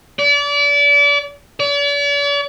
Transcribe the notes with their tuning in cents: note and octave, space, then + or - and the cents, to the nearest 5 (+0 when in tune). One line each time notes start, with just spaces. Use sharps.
D5 -35
D5 -45